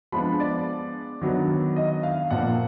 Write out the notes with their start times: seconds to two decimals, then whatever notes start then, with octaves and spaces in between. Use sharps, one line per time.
0.12 F3 G#3 B3 D4 B5
0.40 D5
1.21 D#3 F#3 B3 D4
1.76 D#5
2.03 F5
2.31 A#2 F3 A#3 F#5